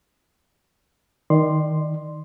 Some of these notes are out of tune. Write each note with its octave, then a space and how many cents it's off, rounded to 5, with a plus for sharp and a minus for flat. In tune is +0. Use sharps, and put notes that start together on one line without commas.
D#3 +5 D5 +25 C6 +0